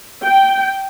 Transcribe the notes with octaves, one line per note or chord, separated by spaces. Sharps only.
G5